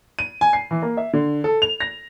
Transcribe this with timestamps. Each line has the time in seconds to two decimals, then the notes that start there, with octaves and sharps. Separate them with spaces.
0.19 D#7
0.41 G#5
0.53 C7
0.71 E3
0.82 A#3
0.97 E5
1.13 D3
1.44 A4
1.62 F7
1.80 A#6